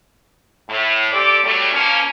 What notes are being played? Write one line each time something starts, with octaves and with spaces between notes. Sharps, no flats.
A2
C4 G4 A4 D5
F#3 G3 A3
F3 A#3 C#4